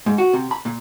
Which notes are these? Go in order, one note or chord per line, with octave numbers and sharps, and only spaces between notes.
G#2
F#4
C3
B5
A#2